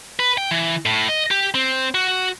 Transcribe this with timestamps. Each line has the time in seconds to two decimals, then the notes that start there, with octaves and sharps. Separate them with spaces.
0.19 B4
0.38 G5
0.51 E3
0.86 A2
1.08 D#5
1.31 G4
1.54 C4
1.94 F#4